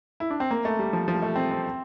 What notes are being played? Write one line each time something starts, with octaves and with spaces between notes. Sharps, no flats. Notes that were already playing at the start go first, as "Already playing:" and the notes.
E4
D4
C4
A#3
A3
G3
F3
F3
G3
A3
C4
C4